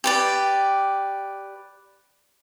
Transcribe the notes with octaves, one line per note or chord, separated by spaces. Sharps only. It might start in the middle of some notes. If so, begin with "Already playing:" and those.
G4 B4 D5